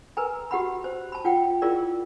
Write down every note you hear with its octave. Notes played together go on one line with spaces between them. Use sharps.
A#4 B4 G#5 A#5
F#4 G4 F#5 B5
C5
A5 B5
F4 F#5 G5
E4 F4 G#4 A#4 D5